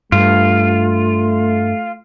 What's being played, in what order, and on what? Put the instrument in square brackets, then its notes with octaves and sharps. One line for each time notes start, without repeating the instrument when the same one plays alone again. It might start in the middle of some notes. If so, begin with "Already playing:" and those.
[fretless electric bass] G2 [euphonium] A3 [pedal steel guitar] F4